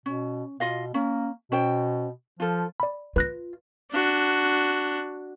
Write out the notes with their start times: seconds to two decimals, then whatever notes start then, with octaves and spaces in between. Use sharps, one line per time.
0.06 B2 C#4
0.60 B2 F4 D#5 F5
0.94 A#3 C#4
1.52 B2 C#4 C5 G5
2.40 F3 F4 A4
2.80 D5 B5
3.16 F4 B4 F#6 A#6
3.91 D4 F#4